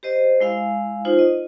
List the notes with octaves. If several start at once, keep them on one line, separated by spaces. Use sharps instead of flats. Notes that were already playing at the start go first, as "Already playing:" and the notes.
G4 C5 D#5
G#3 E4 F5 G#5
D#4 F4 C5
D#5